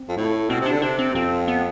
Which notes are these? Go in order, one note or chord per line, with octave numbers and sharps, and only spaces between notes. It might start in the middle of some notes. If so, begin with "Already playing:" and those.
Already playing: C4
F2
A2
B2 C4
C3
D4
D3
C3 D4
C4
F2 C4
B3